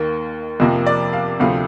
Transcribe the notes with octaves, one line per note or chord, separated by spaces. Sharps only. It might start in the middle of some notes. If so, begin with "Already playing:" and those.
Already playing: D#2 D#3 A#3
F2 C3 F3 A#3
D5
F5
D2 C3 F3 A3 F5